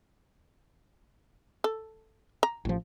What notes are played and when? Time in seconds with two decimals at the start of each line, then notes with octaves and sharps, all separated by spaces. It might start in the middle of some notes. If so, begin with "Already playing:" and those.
1.64 A4
2.43 A#5
2.65 A1 F3